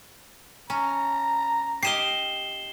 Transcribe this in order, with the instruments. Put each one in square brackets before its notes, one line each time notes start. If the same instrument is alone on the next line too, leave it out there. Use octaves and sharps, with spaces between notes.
[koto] C#4 [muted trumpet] A#5
[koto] G4 D#5 F5 [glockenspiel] C7 E7 G7